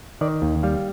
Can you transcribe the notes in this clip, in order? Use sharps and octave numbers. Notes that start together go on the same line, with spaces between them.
D#3 D5
D#2
G3 F5